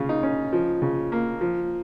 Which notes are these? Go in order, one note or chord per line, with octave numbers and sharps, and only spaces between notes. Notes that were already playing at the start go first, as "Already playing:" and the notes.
Already playing: C#3 F4
D#4
C#4
F3
C#3
A#3
F3